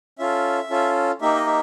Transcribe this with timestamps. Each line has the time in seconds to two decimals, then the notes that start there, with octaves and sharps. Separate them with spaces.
0.19 C#4 F4 A4 E5
0.70 C#4 F4 A4
1.21 A#3 D#4 G4 E5
1.36 D#5
1.47 E5